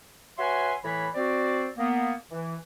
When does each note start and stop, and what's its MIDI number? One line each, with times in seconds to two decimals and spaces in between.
0.38 0.73 66
0.38 0.73 71
0.38 0.73 73
0.38 0.73 76
0.38 0.73 80
0.38 0.73 84
0.84 1.07 45
0.84 1.07 52
0.84 1.07 73
0.84 1.07 83
1.15 1.68 60
1.15 1.68 66
1.15 1.68 74
1.78 2.13 58
1.78 2.13 59
2.31 2.56 52